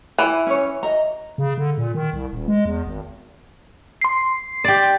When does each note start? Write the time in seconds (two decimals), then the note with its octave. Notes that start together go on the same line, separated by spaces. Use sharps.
0.18 E3
0.47 C#4 C#5
0.83 D#5 A#5
1.38 C#3
1.58 D3
1.78 A#2
1.95 D#3
2.13 C2
2.31 D#1
2.48 G#3
2.65 E2
2.86 G#1
4.01 C6 C7
4.64 G4 D5